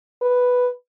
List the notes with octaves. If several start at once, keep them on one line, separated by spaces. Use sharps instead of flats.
B4